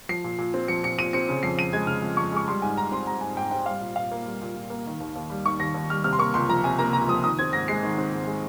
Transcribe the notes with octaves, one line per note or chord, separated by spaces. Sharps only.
F3 C7
A#2
A#2
C4
F3 C#7
A#2 C#7
A#2 D#7
C4 C#7
C#3
F2 C7
F2 D#7
G#3 G#6
C#3 F6
F2
F2 C#6
G#3 C#6
G3 C6
G#2 G#5
G#2 A#5
C4 C6
G3 A#5
G#2 G#5
G#2 G5
C4 G5
G3 F5
A#2
A#2 F5
A#3
G3
A#2
A#2
A#3
D#3
D#2
D#2
G3
D#3 C#6
D#2 A#6
D#2
G3 F6
C3 F6
C6
A#3 C#6
C#2 C6
F3 A#5
C3 G#5
A#3 A#5
C#2 A#5
F3 D#6
D#3 D#6
C4 G#6
G#2 A#6
G#3 C7
D#3
C4
G#2
G#3